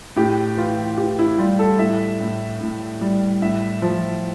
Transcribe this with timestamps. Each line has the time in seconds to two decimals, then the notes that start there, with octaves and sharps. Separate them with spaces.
0.16 A2 G4
0.57 E3 F4
0.98 E3 G4
1.19 E4
1.38 G3 F4
1.59 A4
1.79 A2 E5
2.20 A2
2.61 A2
3.01 G3
3.42 A2 E5
3.82 F3